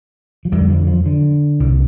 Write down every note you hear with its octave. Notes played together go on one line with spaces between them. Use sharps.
F3
F2 D3 G3
F3
F3
D3
C2 A#2